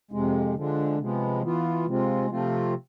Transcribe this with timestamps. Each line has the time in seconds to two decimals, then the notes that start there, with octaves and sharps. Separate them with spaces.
0.11 F2 C3 G#3
0.55 D3 F3 G#3 D4
0.98 C3 F3 G#3 B3
1.42 E3 B3 F4
1.86 C3 G#3 C4 F4
2.30 C3 F3 A3 C4 F4